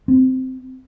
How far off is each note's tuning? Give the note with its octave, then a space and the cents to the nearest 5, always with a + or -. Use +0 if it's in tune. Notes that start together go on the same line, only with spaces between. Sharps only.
C4 -10